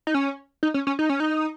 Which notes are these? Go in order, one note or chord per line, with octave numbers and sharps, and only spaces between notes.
D#4
C#4
D#4
C#4
C#4
D#4
C#4
D#4